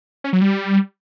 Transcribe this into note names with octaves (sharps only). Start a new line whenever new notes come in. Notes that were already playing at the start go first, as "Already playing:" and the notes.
C#4
F#3
G3